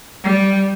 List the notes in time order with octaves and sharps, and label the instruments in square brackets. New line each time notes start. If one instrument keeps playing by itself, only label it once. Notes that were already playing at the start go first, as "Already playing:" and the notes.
[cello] G3